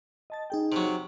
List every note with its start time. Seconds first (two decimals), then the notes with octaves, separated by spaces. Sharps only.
0.30 D#5 A5 A6
0.50 D#4 G#4 G5
0.72 C3 F#3